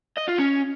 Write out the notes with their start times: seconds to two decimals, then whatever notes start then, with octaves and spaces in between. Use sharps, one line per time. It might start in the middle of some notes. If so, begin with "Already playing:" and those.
0.18 D#5
0.29 F4
0.40 C#4